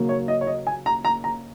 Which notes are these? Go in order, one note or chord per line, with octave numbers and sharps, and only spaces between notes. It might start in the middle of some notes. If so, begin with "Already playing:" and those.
Already playing: D#2 C#3 F#3 A#3
C#5
D#5
C#5
D#5
G#5
A#5
A#5
A#5